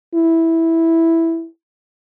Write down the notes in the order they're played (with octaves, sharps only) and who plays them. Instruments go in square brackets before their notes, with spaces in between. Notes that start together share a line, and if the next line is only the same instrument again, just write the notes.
[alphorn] E4